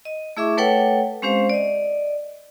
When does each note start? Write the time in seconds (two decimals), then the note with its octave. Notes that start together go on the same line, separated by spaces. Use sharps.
0.05 D#5
0.37 A3 E4 G#4 E5 C#6 D6
0.58 A3 A4 B4 C#5 F#5 G5
1.22 G#3 C4 C#4 G4 C5 F5
1.50 D5 D#5